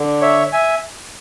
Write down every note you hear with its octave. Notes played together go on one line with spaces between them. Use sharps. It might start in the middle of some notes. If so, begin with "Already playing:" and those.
Already playing: D3
C#5 E5
E5 G#5